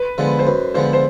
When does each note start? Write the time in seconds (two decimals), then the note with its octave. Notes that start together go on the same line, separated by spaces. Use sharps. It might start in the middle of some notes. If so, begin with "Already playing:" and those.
Already playing: B4
0.18 D3 F3 G#3 B3
0.39 C5
0.47 F#2 B4
0.74 D3 F3 G#3 B3 C5
0.93 C5